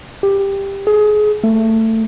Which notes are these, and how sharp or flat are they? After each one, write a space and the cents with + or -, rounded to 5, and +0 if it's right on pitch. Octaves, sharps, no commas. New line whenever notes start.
G4 +10
G#4 +25
A3 +20